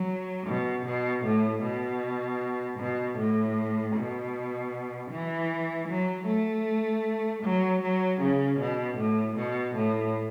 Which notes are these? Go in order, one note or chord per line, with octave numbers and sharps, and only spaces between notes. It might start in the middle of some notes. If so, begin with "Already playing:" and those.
Already playing: F#3
B2
B2
A2
B2
B2
A2
B2
E3
F#3
A3
F#3
F#3
C#3
B2
A2
B2
A2